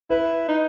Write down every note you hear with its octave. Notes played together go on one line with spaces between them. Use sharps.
E4 B4
D#4